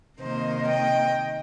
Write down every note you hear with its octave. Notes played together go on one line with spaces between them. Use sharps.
C3 D#3 A#3 C5 D#5
D#5 G5